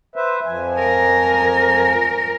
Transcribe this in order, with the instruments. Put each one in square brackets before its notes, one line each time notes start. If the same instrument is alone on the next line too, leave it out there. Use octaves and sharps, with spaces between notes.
[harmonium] B4 C5 E5
F2 F3 G#5
[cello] A#4